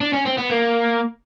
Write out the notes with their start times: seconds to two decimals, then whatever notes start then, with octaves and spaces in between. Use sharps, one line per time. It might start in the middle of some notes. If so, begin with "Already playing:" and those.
0.01 D4
0.13 C#4
0.26 C4
0.38 B3
0.50 A#3